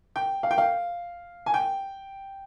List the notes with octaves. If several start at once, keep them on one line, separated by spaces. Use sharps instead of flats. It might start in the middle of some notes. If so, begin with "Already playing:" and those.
G5
F5
G5
F5
G#5
G5